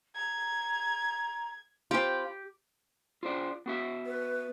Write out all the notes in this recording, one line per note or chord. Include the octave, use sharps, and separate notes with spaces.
A#5 G#6
C4 F4 G4 B5
F4 C5 D5
B3 F#4 E5
B4